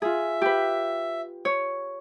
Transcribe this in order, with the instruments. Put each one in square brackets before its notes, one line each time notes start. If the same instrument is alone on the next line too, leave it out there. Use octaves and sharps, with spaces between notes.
[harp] F4 G#4 [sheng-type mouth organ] E5
[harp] G4 B4
C#5